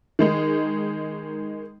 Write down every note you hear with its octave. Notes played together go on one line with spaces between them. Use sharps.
D#3 G#3 D#4